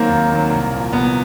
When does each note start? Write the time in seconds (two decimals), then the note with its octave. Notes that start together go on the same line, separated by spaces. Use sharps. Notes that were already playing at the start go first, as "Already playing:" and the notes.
Already playing: D#3 F#3 A#3 C4
0.09 D#2
0.30 D#3 F#3
0.50 C2
0.72 A#2 F3
0.93 C2 B3